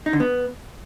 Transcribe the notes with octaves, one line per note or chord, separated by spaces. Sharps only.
D#4
D3
B3